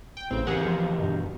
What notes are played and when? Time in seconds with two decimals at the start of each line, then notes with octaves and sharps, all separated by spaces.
0.17 G5
0.31 A1 C#3 C4
0.47 E2 G4 G#4 A#4 F#5
0.66 F3
0.99 G2 B2